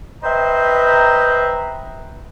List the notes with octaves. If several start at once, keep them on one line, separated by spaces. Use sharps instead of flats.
B4 C5 D#5 E5 G5 A#5